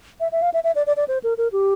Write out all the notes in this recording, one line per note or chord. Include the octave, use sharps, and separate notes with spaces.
E5
E5
F5
E5
E5
D5
D5
D5
C5
A#4
A#4
G4